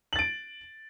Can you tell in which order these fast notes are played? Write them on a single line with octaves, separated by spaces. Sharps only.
F#7 A6 D7